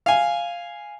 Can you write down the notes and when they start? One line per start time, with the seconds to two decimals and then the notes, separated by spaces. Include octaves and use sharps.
0.06 F5 G#5